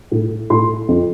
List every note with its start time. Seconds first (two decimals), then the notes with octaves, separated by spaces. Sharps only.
0.11 A2
0.50 A2 C6
0.88 F2